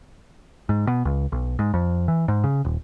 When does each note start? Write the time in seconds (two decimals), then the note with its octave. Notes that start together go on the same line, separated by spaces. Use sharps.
0.69 G#2
0.87 B2
1.05 C#2
1.32 B1
1.59 G#2
1.74 F2
2.08 E3
2.28 G#2
2.44 C#3
2.65 D#1